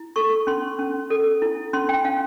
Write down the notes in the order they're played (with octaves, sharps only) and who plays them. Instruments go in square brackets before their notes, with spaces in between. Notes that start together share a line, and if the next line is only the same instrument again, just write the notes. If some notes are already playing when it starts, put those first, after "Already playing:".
Already playing: [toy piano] E4
A4 C#6
C#4 C6
C#4
A4
E4
C#4 C6
G5
C#4 F5